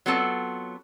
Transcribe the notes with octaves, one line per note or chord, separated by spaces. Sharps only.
F#3 B3 C4 F4 A4 A5